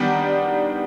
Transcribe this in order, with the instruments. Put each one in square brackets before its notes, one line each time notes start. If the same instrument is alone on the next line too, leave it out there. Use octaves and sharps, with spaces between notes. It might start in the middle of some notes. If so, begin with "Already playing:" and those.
Already playing: [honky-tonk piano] D#3 G3 B3 D4 G4